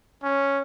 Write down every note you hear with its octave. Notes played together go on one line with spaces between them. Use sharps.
C#4